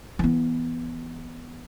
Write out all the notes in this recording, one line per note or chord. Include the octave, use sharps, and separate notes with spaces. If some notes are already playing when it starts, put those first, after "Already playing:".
E3 B3